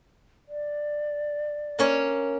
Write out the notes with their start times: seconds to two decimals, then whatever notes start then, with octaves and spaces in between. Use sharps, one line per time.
0.48 D5
1.79 A#3 C#4 C#5